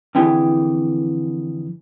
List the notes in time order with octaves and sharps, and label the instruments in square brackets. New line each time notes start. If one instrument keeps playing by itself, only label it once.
[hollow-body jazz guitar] F2 D3 E3 G4 G#4